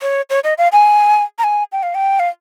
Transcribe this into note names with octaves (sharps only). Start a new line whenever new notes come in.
C#5
C#5
D#5
F5
G#5
A#5
G#5
G5
F5
G5
F5